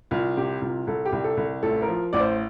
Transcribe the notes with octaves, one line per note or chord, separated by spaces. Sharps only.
C2 F4
C3 G4
C2 F4
C2 A4
G4
C2
A4
C2
A1 A4
A#4
F3
A1 D5
C5